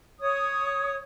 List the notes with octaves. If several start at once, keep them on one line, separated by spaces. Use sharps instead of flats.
C#5 D#6